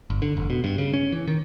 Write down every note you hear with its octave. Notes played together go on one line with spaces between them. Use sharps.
G1
D3
F1
B2
G2
C#3
C#4
E3
D#3